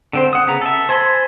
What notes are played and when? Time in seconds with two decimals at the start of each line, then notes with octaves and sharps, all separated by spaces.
0.13 D3 C4 C5
0.33 F#5 D#6
0.47 C#3 B3 A#5
0.61 A4 E5
0.89 C5 G#5 A5 B5 C6